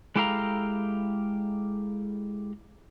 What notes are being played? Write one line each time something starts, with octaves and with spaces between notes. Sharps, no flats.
G#3 E4 G4 A4 F5 A#5